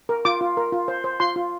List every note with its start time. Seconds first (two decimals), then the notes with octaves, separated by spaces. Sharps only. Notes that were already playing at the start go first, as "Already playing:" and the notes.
0.09 A#4
0.25 F4 D6
0.41 F4
0.57 A#4
0.72 F4
0.88 C5
1.04 C5
1.20 F4 C6
1.36 F4